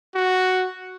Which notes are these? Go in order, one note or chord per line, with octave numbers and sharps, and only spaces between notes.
F#4